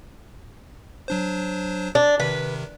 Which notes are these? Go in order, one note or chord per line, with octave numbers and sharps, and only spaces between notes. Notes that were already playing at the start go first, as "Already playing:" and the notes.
F#3 D4 C5
D4
C3 D#3 B4